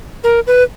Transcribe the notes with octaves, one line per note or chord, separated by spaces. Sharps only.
A#4
B4